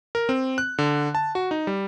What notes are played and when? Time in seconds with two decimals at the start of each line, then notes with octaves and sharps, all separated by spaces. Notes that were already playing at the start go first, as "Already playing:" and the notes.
0.15 A#4
0.29 C4
0.58 F#6
0.78 D3
1.15 A5
1.35 F#4
1.51 D#4
1.67 G3